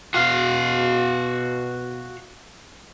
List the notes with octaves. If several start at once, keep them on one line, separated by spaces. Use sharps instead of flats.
B2 F#4 F5